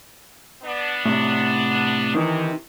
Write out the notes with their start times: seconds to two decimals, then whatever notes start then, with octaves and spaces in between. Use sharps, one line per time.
0.63 B3 D4
1.06 A2 C3
2.15 C3 D#3 E3